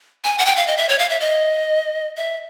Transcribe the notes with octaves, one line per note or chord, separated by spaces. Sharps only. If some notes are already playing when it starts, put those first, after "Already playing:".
G#5
F#5
G5
F5
D#5
E5
C#5
F5
E5
D#5
E5